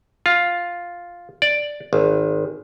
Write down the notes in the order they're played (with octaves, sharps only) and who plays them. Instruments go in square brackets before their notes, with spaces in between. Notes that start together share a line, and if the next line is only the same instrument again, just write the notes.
[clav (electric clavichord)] F4
D5
G#1